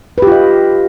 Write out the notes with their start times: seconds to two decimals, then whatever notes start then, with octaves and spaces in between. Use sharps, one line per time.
0.18 B4
0.22 G4
0.27 F4
0.32 D#5